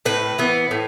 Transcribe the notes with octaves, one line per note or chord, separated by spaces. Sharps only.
A2 B4
E3 B3
A2